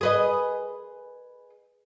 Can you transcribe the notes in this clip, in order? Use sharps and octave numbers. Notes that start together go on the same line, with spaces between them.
G#4 B4 D#5